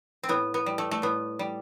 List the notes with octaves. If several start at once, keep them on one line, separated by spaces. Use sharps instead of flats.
C4
A2 B3
B3
G3
A3
A3
A2 B3
G3